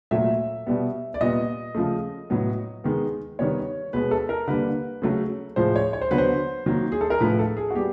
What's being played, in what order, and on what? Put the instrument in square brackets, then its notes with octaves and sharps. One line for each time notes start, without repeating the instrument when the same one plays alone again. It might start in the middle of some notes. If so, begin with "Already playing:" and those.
[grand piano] A#2 F#3 A3 E5
B2 G3 B3
D5
A#2 G3 B3 D#5
C#3 F3 A3
A2 F#3 B3
D#3 G#3 B3
D#3 G3 B3 C#5
B2 G#3 B3 B4
A4
A#4
D3 G3 A#3 B4
C#3 F#3 A3
A2 F3 G#3 C5
C#5
C#5
C5
D3 F#3 B3 B4
C5
D#3 F#3 A#3
G#4
A4
A#4
A2 F3 A3 B4
A4
G#4
F#4
G3 B3 G4